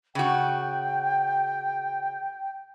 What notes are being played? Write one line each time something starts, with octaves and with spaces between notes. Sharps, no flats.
C#3 F#4 G5